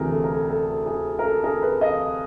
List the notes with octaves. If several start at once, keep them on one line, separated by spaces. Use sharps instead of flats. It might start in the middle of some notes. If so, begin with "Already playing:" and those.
Already playing: D2 C3 E3 G#4 A#4
A4
A#4
A4
A4
G#4
A#4
A4
G#4 A#4
A4 B4
D#5 F5